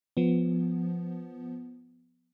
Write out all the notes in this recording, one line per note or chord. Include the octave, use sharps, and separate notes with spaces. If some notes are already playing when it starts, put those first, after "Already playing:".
F3 B3